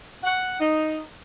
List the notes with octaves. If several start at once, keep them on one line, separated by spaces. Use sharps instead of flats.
F#5
D#4